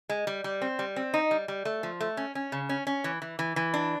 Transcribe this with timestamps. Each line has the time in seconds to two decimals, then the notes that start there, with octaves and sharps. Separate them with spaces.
0.09 G#3
0.27 G3
0.44 G3
0.61 C4
0.79 G3
0.96 C4
1.14 D#4
1.31 G3
1.48 G3
1.65 A3
1.83 F3
2.00 A3
2.17 C#4
2.35 C#4
2.52 C#3
2.69 C#4
2.87 C#4
3.04 E3
3.22 E3
3.39 E3
3.56 E3
3.74 D4